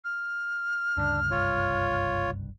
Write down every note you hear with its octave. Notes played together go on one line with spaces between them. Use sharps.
F6
D2 G2 C#3 D4
F#1 C2 G2 F4 C#5